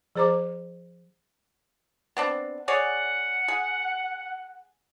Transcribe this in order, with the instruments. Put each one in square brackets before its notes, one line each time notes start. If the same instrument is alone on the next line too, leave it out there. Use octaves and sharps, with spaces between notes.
[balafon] F3 G#4 C5 A#5 D6
[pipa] B3 C4 D4
[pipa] G#4 C#5 D5 [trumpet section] F#5
[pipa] G#4